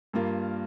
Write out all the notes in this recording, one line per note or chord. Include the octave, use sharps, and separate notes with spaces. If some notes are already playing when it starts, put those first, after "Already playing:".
G2 G3 A#3 F4 A#4